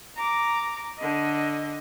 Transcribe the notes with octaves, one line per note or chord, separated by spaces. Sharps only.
A#5 D6
D3 D#5